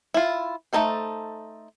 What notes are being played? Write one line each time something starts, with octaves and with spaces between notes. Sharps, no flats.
E4 F4
A3 C#4 D#4 A4 C5